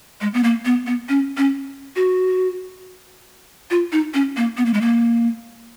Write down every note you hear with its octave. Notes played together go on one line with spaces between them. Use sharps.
G#3
B3
A#3
B3
B3
C#4
C#4
F#4
F4
D#4
C#4
A#3
B3
A#3
G#3
A#3